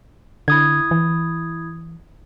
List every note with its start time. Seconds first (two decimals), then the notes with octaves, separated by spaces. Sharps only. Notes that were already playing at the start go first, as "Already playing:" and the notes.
0.48 D3 E4 D#6 G#6
0.91 E3